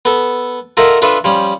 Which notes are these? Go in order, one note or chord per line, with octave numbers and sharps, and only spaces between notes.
B3 A4
F4 A4 A#4 D#5 E5 F#5
D4 F4 A4 B4 E5
F3 G3 C#4